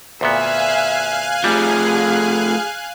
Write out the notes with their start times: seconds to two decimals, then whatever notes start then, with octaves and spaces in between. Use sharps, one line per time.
0.21 D2 A#2 B3 E5 F5 G#5 F#6
1.44 F3 G3 A3 G#4